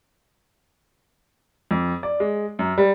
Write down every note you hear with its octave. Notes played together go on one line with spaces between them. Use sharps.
F2
D5
G#3
F#2
G3